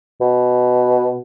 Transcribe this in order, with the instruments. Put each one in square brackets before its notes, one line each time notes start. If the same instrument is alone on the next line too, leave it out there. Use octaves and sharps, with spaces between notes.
[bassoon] B2